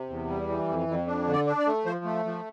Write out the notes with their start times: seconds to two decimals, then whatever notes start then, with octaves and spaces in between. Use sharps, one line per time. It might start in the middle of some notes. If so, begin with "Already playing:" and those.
Already playing: C3
0.09 E2
0.28 G3
0.48 E3
0.68 F2
0.88 F2
1.07 D4
1.27 D3
1.33 D5
1.46 D4
1.59 D5
1.67 A3
1.85 F3 C5
2.05 A3
2.25 F3